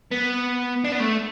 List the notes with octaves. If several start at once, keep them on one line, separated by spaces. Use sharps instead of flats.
B3
D4
B3
A3